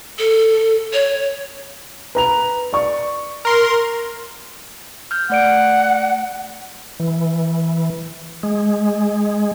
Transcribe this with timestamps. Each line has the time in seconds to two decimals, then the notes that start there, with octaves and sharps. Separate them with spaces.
0.19 A4
0.93 C#5
2.15 B4 A#5 F7
2.73 D5 C#6
3.45 A#4 C6
5.11 F6 G6
5.30 A3 D5 F#5 D7
7.00 E3
8.43 G#3